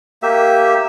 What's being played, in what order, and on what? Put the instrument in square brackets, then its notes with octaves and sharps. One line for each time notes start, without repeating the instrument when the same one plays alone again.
[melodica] A#3 G4 E5